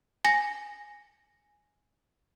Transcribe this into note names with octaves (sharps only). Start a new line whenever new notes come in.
G#5 A#6